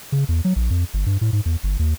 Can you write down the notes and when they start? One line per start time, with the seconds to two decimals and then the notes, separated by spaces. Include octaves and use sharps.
0.12 C#3
0.29 E2
0.45 F#3
0.56 A#1
0.70 F2
0.94 G1
1.06 G2
1.21 A2
1.33 G#2
1.46 E2
1.63 G1
1.79 D#2